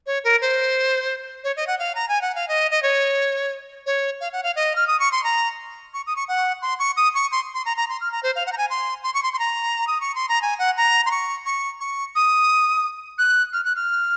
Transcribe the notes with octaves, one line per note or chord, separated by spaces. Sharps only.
C#5
A#4
C5
C#5
D#5
F#5
F5
A#5
G#5
F#5
F5
D#5
D#5
C#5
C#5
F5
F#5
F5
D#5
F6
D#6
C#6
C6
A#5
C#6
D#6
C#6
F#5
C6
C#6
D#6
C#6
C6
C6
A#5
A#5
C6
F6
A#5
C5
F5
F#5
A#5
G#5
C6
C6
C#6
C6
C6
A#5
D#6
C#6
C6
A#5
G#5
F#5
A#5
C6
C#6
C#6
C#6
D#6
F#6
F6
F#6
F6